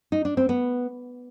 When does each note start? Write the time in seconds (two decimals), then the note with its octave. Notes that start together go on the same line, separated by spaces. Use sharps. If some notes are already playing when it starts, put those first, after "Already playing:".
0.12 D#4
0.25 D4
0.37 C4
0.49 B3